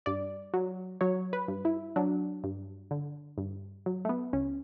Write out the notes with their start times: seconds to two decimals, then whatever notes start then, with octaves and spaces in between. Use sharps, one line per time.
0.06 G2 D5
0.54 F#3
1.01 F#3 C#5
1.33 B4
1.48 G2
1.65 E4
1.96 F#3 D4
2.44 G2
2.91 D3
3.38 G2
3.86 F#3
4.05 A3
4.09 B3
4.33 C#2 C#4